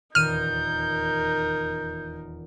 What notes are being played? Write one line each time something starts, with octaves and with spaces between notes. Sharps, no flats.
D#1 E2 D#4 A#4 F6 G6 D#7